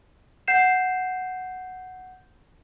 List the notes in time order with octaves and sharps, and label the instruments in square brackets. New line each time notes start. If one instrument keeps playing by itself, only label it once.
[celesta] F#5 G6 C7 E7